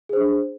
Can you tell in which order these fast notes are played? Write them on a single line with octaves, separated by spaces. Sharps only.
G#4 C5 D4